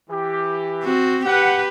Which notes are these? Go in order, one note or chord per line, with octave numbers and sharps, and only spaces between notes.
E3 G4
C4 F#4
G4 B4 F#5